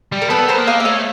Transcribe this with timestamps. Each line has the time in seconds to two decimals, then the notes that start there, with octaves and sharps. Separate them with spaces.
0.12 G3
0.22 A#4
0.30 B3 A4 B4
0.49 A#4 C5
0.58 A#3
0.67 D#5 F5
0.80 E5
0.85 A3 C#5 D#5